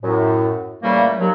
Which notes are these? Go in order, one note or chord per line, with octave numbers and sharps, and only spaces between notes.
F#2 A2
A#2 C#3 E3 G3 A3 A#3
D#2 F#3